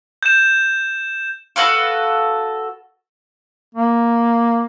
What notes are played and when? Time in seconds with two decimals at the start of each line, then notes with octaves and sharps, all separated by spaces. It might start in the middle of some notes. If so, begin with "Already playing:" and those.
0.23 G6 E7
1.56 F#4 A4 B4 F5
3.75 A#3